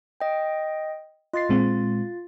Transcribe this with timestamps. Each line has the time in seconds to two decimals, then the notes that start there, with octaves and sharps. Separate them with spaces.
0.20 D#5 G5
1.34 F4 D#5 C6 A6 C7
1.49 A#2 G#3 C4